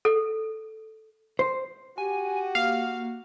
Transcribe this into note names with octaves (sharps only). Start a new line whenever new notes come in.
A4
C5
F#4 G4 G#5
A#3 F5